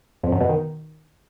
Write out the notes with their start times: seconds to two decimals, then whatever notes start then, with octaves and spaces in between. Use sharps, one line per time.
0.23 F2
0.32 F#2
0.41 B2
0.49 D#3